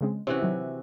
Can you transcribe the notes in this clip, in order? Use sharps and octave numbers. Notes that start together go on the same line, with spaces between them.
C#3 G#3 C4
C3 E3 C#4 F#4 C5
D#3 F#3